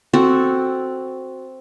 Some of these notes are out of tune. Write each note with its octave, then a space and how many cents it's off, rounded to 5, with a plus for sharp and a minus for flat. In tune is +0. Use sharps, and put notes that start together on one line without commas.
C4 +0 F#4 +0 A4 +0